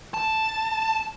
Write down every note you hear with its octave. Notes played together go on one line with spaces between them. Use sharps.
A5